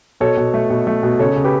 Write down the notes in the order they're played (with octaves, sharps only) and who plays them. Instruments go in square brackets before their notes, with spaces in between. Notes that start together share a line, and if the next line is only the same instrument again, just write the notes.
[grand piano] B2 A4 C#5
B2
A3
B2
A3
B2
C#3 A4 C#5
C#3
G4 B4